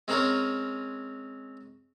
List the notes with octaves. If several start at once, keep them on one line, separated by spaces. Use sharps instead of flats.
G#3 C4 C#4 A#4 C5 C#5